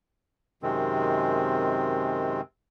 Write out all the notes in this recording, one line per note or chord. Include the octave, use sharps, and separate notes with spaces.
F#2 C3 D#3 G#3 C4